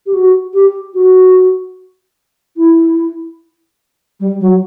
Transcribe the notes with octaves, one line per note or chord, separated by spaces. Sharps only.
G4
F#4
G4
F#4
E4
G3
F#3